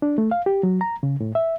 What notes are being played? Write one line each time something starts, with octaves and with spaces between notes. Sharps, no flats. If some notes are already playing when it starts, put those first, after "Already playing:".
D4
A3
F5
G4
F#3
A#5
C#3
A2
E5